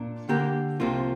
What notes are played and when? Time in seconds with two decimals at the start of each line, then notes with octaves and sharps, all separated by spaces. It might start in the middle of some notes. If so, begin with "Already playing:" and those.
Already playing: A#2 D4
0.29 D3 A#3 G4 A#4
0.80 C2 C3 F3 A#3 F4